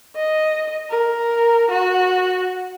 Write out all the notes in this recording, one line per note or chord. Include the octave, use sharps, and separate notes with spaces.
D#5
A#4
F#4